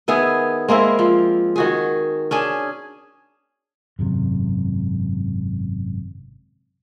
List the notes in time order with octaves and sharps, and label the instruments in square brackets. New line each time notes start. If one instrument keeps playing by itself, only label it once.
[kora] D#3 B3 E4 G#4
G#3 A#3 C4 E4
F3
D#3 F#4 G#4
C#4 D4 G#4
[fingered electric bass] G#1 F#2 C3